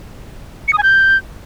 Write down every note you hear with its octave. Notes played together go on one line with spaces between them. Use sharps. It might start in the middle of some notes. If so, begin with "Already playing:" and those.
C#7
D#6
G#5
G6